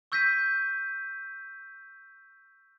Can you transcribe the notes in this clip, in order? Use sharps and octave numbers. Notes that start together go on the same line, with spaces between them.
C#6 E6 G6 A#6 B6 D#7